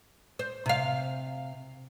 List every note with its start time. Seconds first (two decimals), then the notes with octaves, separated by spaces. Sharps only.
0.39 C5
0.66 C3 F5